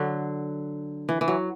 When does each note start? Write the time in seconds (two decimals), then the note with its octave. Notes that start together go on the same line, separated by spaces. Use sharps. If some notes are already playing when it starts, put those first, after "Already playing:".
Already playing: D3 F#3
1.09 E3
1.21 E3
1.28 F#3